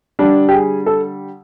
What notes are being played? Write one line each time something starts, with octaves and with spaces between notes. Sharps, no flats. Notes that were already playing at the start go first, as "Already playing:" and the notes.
D3 G3 D4
G4
G#4
A4